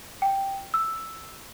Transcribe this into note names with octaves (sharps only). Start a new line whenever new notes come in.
G5
E6